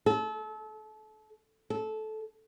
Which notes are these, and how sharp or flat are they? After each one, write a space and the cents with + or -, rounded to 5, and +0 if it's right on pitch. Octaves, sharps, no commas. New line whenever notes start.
A4 -30
A4 -15